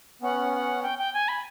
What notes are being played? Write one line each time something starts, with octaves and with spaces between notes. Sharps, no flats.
B3 C#4 F#5
F#5
G5
G5
G#5
B5